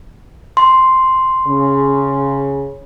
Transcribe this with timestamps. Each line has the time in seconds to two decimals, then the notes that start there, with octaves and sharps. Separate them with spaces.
0.57 C6
1.48 C#3